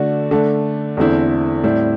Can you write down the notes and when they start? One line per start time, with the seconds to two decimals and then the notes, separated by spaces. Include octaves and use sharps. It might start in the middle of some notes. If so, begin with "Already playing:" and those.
Already playing: D3 A3 D4 F#4
0.31 D3 A3 D4
0.97 E2 D3 A3 C4 E4
1.63 A2 G3 C4 E4